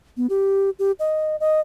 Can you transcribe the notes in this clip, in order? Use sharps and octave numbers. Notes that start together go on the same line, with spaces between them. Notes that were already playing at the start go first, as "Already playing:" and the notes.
B3
G4
G4
D#5
D#5